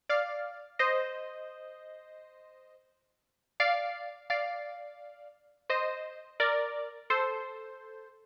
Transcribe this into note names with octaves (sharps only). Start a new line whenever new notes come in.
D5 F5
C5 D#5
D5 F5
D5 F5
C5 D#5
A#4 D5
A4 C5